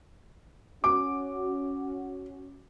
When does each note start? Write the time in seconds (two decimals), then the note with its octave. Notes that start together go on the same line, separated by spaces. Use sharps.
0.84 C#4 F#4 D6